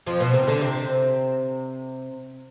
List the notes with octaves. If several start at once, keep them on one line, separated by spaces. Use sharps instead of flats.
F2 F3
B2 B3
C3 C4
D3 D4
C3 C4